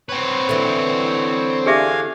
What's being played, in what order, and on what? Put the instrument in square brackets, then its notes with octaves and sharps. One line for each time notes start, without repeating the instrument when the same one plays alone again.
[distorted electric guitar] C4 B4 [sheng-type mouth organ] C#5
[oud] D3 E3
[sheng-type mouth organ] D4 F5 G#5 [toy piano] G4 G#4 E5